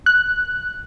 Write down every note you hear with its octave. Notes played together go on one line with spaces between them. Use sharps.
F#6